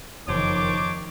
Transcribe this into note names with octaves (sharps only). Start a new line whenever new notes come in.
F#1 F2 D#3 F3 C5 C#5 A5 D6